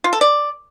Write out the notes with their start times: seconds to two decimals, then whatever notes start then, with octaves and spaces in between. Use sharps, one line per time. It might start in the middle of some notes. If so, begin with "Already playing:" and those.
0.04 F4
0.13 A4
0.21 D5